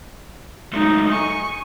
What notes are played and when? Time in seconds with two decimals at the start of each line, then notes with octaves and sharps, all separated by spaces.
0.73 F#3 G#3 A3 D#4
1.11 G#5 C#6